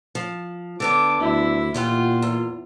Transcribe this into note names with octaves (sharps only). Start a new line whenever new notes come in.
F3
D3 B3 D4 D6
D2 E4
E2 A#2 F4 G4 F#5
E2